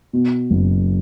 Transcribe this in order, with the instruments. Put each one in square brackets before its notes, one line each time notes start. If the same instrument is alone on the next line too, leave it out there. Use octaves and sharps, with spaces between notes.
[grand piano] B2
F#1